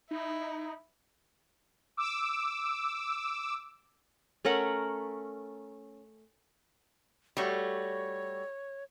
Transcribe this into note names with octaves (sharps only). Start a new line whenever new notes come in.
D#4 E4
D6 E6
A3 C#4 A#4 F#5
G3 A3 F#4 C#5